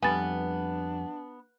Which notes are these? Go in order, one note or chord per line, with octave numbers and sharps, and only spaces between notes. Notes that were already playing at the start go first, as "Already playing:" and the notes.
F2 G3 B3 D4 G#5 B5 A6